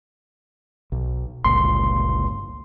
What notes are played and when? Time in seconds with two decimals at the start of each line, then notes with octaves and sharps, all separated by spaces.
0.92 B1
1.45 G1 C#2 A#2 C6